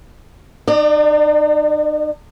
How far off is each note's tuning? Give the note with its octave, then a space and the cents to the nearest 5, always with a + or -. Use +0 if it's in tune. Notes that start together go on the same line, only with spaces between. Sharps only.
D#4 -40 D5 +20